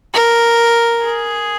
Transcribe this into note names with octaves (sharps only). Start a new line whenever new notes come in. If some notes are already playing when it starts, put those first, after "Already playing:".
A#4
G#4